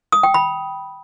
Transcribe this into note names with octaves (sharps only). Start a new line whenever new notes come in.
D#6
G5
B5